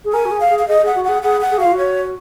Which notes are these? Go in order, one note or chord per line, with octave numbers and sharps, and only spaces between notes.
G#4
A#4 G#5
F#4
G#4
F5
G#4
F5
G#4 D#5
G#4 F#5
F#4
G#4 F#5
G#4 F#5
F#5
G#4
F#4 F5
F4
F#4
C#5